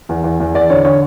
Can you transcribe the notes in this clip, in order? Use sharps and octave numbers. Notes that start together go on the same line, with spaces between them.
E2
E2
E2
E2 D5
D3 C#5
D3 C#5